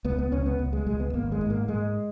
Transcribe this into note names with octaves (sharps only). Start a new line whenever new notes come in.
C#2 B3
B3
C#2 C#4
B3
C#2
G#3
C#2 G#3
B3
G#1 A#3
G#3
G#2
A#3
G#2 G#3